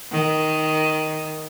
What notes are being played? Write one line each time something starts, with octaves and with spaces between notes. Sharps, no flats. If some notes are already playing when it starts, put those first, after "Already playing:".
D#3